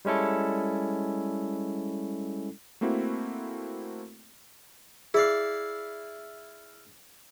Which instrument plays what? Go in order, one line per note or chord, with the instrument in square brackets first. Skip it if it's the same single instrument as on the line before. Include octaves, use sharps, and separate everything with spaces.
[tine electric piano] G3 G#3 C#4 E4 A4
[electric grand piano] A3 A#3 C4 E4 F#4
[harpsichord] E4 D5 F5 [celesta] G#4